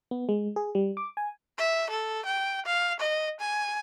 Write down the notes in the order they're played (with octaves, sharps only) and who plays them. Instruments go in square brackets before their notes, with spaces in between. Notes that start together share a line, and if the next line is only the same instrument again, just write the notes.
[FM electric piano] B3
G#3
G#4
G3
D6
G#5
[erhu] E5
A4
G5
F5
D#5
G#5